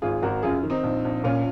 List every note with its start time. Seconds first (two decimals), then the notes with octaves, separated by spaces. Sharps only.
0.02 G#1 F4 G#4
0.22 G#1 F#4 A#4
0.42 F#2 F4 G#4
0.63 D#3
0.70 C4 D#4
0.83 A#1
1.05 A#1
1.24 A#2 C#4 F4